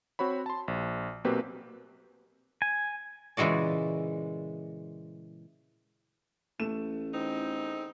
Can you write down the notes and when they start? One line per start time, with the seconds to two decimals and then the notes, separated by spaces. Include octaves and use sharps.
0.19 C4 F#4 C#5 B5
0.46 A5 C6
0.68 A#1
1.24 B1 A#3 C4 F#4 G4 B4
2.62 G#5
3.37 A#2 C#3 E3 G#3 F#4 D5
6.59 A1 A3 E7
7.14 E2 C4 D#4